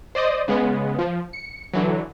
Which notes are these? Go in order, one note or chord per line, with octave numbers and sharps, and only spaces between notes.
C5 D5 D#5 D#6
C#3 G#3 B3
F3
C#7
D3 E3 F#3